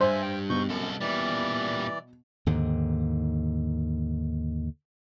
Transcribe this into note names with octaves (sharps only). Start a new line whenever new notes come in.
G2 C5 E5 G#5
G5
G#2 B2 C#6 G6
C2 F#2 A4
A#2 E3 G3 D5
D#2 G#2 D3